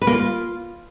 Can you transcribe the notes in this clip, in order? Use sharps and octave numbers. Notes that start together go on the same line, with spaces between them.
B4
A#3
F4